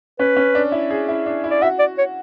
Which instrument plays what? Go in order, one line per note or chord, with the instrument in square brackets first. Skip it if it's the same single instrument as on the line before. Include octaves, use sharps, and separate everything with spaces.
[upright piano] C#4 [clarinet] B4
[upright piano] C#4
D4
E4
G#4
E4
D4
E4
[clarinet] D5
[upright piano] F#4 [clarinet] E5
[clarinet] D5
C#5